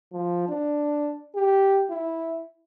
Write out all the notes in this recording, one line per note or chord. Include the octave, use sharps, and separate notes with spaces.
F3
D4
G4
E4